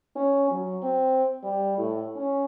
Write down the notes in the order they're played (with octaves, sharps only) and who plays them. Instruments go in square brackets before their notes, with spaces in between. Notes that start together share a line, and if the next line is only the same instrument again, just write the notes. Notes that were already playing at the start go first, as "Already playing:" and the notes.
[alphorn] C#4
F#3
C4
G3
A2
C#4